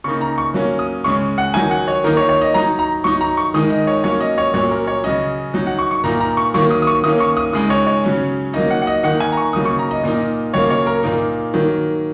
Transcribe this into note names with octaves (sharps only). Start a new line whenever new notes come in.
C#3 A#3 D#4 C#6
A#5
C#6
F#3 A#3 C#4
D#6
C#3 G#3 C#4 C#6
F#5
D#3 F#3 D#4 G#5
F#5
C#5
D#3 A#3 D#4 A#4
C#5
C#5
D#5
F#3 D#4 A#5
A#5
F#3 D#4 C#6
A#5
C#6
D#3 G#3 D#4 D#6
D#5
C#5
F#3 A#3 C#4 C#5
D#5
C#5
A#2 F#3 C#4 C#5
A#4
C#5
C#3 F#3 C#4 D#5
F#3 D#4
F#5
C#6
C#6
A#2 A#3 D#4 A#5
A#5
C#6
D#3 F#3 A#3 C#6
D#6
D#6
C#6
D#3 A#3 C#4 D#6
C#6
D#6
C#3 G#3 D#4 D#6
C#5
C#5
C#3 F#3 C#4
F#3 A#3 D#4 D#5
F#5
F#5
D#5
D#3 A#3 D#4 F#5
G#5
A#5
C#6
C#3 F#3 A#3 D#4 D#6
C#6
A#5
D#5
A#2 A#3 D#4
C#3 F#3 A#3 C#5
C#5
A#4
A#2 A#3 D#4
D#3 F#3 A#3